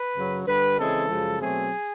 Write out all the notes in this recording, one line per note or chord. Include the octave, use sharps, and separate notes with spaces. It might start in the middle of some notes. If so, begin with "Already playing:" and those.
Already playing: B4
F#2 C#3 F#3
G2 D3 G3 B4
C#3 E3 G#3 C4 A4
F#2 C#3 F3 G#3
B2 F#3 A3 C4 G#4